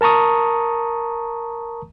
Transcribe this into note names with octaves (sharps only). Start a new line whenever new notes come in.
A#4 A5 A#5 C#6 D#6